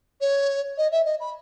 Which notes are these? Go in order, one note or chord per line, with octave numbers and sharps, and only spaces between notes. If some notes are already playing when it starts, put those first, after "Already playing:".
C#5
D#5
E5
D#5
B5